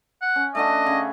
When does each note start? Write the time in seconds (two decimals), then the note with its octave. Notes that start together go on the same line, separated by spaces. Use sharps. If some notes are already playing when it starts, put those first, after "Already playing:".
0.22 F#5
0.36 C#4
0.55 A3 D4 F#4 D#5
0.86 C#3